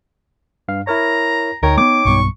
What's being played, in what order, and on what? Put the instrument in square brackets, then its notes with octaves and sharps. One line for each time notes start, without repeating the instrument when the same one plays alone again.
[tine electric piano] G2 F5
[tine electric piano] E4 A#4 C#5 [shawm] A#5
[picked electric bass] D2 [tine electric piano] D#4 C#5 G5 [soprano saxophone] A#4
[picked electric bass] A3 B3 [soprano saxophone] D6
[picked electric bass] B1 G2 B3 [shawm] C#6